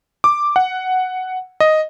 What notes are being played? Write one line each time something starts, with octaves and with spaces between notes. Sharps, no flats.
D6
F#5
D#5